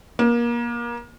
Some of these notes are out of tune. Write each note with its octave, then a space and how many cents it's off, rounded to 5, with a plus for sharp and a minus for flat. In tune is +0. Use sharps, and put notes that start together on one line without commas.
A#3 +30